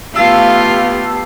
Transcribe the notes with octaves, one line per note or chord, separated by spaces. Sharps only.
A3 B3 F4 G4 F5 A5 E6 C7